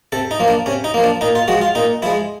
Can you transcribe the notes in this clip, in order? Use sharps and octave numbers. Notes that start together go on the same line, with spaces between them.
C3 A4
D#4
F3 A#3
D4
C3 C#4
D#4
F3 A#3
D4
A#2 D#4
F4
F3 G#3 F#4
F4
A#2 D#4
F3 G#3 E4